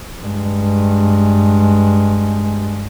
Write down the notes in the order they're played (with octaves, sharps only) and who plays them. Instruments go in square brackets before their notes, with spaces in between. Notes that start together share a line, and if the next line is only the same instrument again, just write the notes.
[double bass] G2 G#3